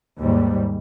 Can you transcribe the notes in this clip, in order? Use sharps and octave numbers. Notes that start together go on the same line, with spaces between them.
D#2 G#2 G3